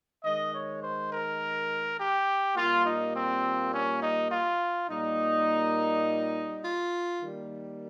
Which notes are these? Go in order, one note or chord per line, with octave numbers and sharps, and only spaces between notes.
D#3 G#3 D#5
C#5
C5
A#4
G4
A#2 G3 A#3 F4
D#4
C4
C#4
D#4
F4
A#2 G3 A#3 D#4
F4
D#3 G3 A#3